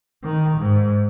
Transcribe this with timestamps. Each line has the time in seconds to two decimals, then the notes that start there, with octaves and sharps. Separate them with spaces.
0.24 D#3
0.58 G#2